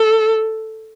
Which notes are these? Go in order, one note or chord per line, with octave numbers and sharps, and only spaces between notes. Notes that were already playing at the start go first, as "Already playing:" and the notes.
Already playing: A4